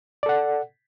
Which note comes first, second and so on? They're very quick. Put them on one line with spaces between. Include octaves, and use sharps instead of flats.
D5 A4 F#5